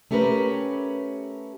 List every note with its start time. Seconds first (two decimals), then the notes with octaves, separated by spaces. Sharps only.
0.11 A3 C#4 G4 A#4 B4